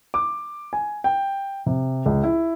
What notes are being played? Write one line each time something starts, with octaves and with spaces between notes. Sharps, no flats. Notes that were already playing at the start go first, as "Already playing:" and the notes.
D6
G#5
G5
C3
C#2
E4